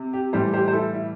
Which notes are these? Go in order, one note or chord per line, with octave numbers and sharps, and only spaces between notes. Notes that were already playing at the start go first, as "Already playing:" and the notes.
Already playing: C3
G4
A2 E3 G3 G4 C5
G4 C5
C5
E4 A4
E4